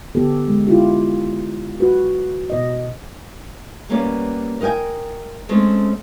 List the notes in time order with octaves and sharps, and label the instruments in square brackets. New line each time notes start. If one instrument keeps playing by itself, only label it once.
[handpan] D3 B3 G4 A4
G#3
E4 F4 G4
F#4 B4
B2 D#5
[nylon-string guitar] G3 A#3 B3 C#4 C#5 D5
A#4 D#5 F5 G5 G#5
G#3 A3 C4 C#4